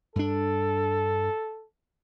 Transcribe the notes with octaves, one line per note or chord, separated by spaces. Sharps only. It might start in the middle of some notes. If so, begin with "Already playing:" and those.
G2 D4 A4